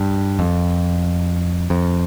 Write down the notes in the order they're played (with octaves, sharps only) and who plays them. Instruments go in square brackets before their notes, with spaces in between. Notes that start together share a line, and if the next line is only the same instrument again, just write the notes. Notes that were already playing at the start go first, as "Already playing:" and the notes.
Already playing: [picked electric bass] G2
F2
F2